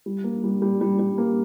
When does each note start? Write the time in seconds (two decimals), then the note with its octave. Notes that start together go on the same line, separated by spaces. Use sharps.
0.06 G3
0.24 A#3
0.44 G3
0.62 G3
0.81 G3
0.99 G3
1.18 A#3